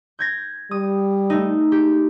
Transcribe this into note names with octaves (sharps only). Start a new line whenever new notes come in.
G6 G#6 A#6
G3 D#6
A3 D#4
G4